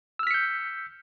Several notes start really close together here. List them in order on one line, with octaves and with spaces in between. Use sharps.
E6 F6 B6 C#7 G6